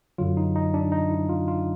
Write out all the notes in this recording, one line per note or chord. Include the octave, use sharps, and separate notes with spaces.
F#2 D3 F#3 F4
D#4
D#4
D4
D#4
E4
F4
F4